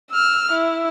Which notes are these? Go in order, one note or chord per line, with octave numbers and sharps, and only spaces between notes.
E6 F6
E4